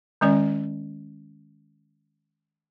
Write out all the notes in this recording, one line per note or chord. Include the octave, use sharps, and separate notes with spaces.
D#3 G#3 C#4 D5